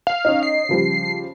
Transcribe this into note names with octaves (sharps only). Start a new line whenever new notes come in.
F5
C#4 D#4
C7
C#3 F3 G3